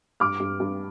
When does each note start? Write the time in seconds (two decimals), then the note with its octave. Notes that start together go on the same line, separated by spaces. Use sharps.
0.20 G2 D6 F6
0.40 G2
0.60 G2